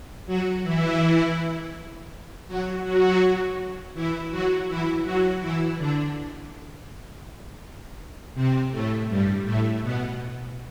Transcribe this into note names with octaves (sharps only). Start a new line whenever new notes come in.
F#3 F#4
E3 E4
F#3 F#4
F#3 F#4
E3 E4
F#3 F#4
E3 E4
F#3 F#4
E3 E4
D3 D4
C3 C4
A2 A3
G2 G3
A2 A3
B2 B3